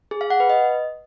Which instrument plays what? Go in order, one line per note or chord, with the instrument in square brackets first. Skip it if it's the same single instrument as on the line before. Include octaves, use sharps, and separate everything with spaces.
[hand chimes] G#4
F5
F#5
B4
D#5